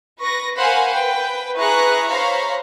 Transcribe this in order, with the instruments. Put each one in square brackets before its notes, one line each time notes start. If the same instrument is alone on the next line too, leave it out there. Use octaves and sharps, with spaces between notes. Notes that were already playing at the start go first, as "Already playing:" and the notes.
[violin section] B4 C#6 A#6
A#4 C5 F5 F#5 G#5 B5
B4 G5
E4 G#4 B4 A#5 C#6 F#6
C5 C#5 F5 A#5 B5 C#6